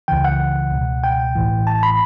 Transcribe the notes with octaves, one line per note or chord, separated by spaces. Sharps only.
C#2 C#3 E3 G5
F#5
C#2 B2
G5
A1 A2 E3
A5
B5